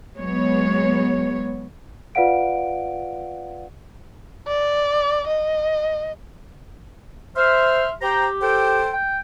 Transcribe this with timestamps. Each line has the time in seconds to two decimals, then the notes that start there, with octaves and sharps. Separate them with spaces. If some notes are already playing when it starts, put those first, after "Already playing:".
0.16 F#3 G#3 B3 C#5
2.15 F4 B4 D5 F5 F#5 D7
4.48 D5
5.27 D#5
7.36 C5 E5 C6 F6
8.02 G4 C5 G5 A#5
8.41 A4 C5 G5
8.93 G5